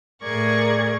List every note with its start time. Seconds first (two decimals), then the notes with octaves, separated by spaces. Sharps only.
0.22 A2 G#4 A#4 D5 C#6 G#6